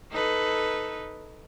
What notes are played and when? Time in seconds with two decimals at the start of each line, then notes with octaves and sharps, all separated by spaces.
0.11 D#4 A4 B4